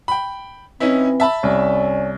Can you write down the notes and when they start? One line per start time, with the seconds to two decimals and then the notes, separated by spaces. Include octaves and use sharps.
0.08 G5 B5
0.80 E3 C4 C#4 D#4 E4
1.20 E5 A5 B5
1.43 C2 C#4 D5